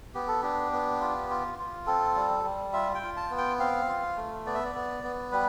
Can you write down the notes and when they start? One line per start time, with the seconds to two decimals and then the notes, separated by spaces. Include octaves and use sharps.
0.14 B3 G4
0.28 A4
0.42 D4 G4
0.72 B3
1.01 F4
1.30 F4
1.59 F4
1.86 C4 A4
2.16 G3
2.44 G3
2.73 F4 E5
2.95 G5
3.03 F4
3.17 A5
3.30 B3
3.38 G5
3.59 C4 F5
3.88 F4
4.17 A3
4.46 B3 D5
4.55 E5
4.65 D5
4.75 B3
5.04 B3
5.32 G3 B4